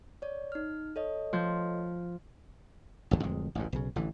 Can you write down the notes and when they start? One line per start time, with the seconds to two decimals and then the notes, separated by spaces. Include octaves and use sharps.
0.22 C#5 D5
0.52 D#4 F6
0.96 A4 C#5 D#5
1.33 F3 G6
3.11 A1 D#2 D3
3.23 D1 F2 G#3
3.55 A1 D2 G2
3.73 B1 C#3
3.96 A1 D3 E3